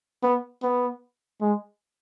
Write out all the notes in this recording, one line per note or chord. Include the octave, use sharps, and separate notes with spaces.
B3
B3
G#3